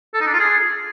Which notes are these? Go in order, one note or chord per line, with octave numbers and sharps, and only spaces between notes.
A4
D#4
D4
F4
G#4